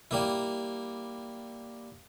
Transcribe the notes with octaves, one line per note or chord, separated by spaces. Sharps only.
G3 A#3 E4